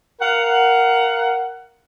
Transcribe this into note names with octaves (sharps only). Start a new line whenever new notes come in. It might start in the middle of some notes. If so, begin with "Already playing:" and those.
A#4 F5 F#5